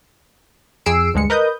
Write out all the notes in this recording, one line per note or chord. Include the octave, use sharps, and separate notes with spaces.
F2 G#4 E6 C7 D7
D2 G2 G#3 C#7
A#4 B4 D#5 D#6 G6